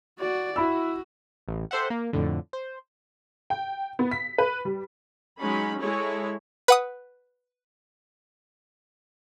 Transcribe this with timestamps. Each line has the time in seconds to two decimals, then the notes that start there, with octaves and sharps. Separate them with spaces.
0.19 F#4 D5
0.56 E4 F#4 B5 E6
1.48 A1
1.71 G4 A4 C5 E5 F#5
1.90 A#3
2.13 F2 A2 D3
2.53 C5
3.50 G5
3.99 B3
4.11 B6
4.38 B4
4.65 G3
5.38 F#3 G#3 C#4 D#4 B5
5.81 G#3 E4 G#4 A4 C#5
6.68 B4 F#5 D#6